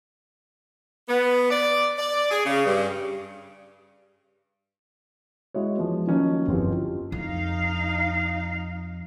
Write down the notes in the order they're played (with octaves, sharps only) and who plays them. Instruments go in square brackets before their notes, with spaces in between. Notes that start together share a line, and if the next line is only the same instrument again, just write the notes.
[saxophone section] B3
D5
D5
G#4
C#3
G2
[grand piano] G#3 E4 F#4 C#5
E3 F3 G#3 B3
D#3 F3 F#3 A#3 C#4 D#4
G1 F2 E3 C4 F4 G4
[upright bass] F2 [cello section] D#4 F5